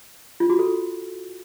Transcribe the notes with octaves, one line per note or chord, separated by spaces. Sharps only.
F4
F#4
A4